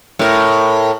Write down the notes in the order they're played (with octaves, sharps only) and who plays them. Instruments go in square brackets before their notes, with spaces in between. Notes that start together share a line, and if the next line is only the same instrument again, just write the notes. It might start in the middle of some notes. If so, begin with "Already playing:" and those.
[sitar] A2 A#4